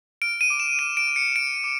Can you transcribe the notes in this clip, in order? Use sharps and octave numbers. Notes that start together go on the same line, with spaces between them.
F6 D7
D#7
D6
E7
F6 D#7
D7
D6
C#7
F6 D7
D6